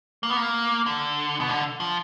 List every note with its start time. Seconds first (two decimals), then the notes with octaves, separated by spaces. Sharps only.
0.23 A#3
0.30 B3
0.37 A#3
0.86 D3
1.40 B2
1.49 D3
1.80 F3